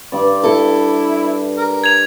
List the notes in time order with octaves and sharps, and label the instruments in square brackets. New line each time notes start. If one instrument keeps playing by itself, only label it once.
[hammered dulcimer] G2 D5
[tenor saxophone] E4 [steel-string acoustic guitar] A4
[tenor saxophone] A#4
[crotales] G#6 F7